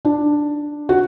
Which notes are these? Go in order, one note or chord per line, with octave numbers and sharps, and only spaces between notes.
D4
F#4